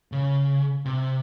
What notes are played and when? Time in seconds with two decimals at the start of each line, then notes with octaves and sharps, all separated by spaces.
0.12 C#3
0.85 C3